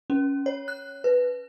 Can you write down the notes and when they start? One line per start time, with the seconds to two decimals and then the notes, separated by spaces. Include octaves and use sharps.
0.10 C#4
0.46 C#5
0.68 F#6
1.04 B4